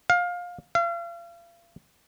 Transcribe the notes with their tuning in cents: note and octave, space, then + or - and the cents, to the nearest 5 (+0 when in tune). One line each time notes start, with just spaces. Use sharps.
F5 +20
F5 -40